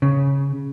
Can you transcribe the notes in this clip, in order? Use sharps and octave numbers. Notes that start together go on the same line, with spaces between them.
C#3